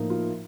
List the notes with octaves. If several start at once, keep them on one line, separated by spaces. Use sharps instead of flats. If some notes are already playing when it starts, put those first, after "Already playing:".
Already playing: A2 F3 A#3 D#4
F4